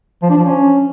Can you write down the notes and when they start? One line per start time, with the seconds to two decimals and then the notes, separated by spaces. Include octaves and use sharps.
0.23 F3
0.30 D4
0.38 F3
0.45 C#4